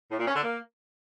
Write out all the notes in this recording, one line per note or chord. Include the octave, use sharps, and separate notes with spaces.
A2
A#2
C#4
D3
A#3